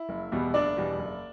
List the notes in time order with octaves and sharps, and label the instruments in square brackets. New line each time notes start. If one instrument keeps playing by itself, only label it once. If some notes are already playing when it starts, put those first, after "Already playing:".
Already playing: [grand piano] E4
F#1
E2 B2 G3 B3
F#1 D4 D5
E2 B2 G3 B3
F#1